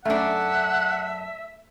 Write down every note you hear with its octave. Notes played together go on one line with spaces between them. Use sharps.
F#2 A3 D4 E5 F#5